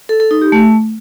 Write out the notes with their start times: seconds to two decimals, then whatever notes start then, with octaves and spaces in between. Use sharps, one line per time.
0.09 A4
0.20 A4
0.31 D#4
0.42 G4
0.52 A3